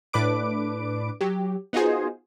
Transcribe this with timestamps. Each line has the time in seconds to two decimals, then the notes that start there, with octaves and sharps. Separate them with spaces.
0.13 A2 D4 B4 D6 D7
1.21 F#3 G4
1.73 B3 D#4 F4 F#4 G#4 C5